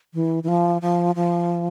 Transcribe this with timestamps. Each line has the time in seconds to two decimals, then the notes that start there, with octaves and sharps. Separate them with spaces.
0.14 E3
0.43 E3
0.48 F3
0.82 F3
1.15 F3